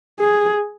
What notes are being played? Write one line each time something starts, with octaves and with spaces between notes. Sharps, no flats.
G#4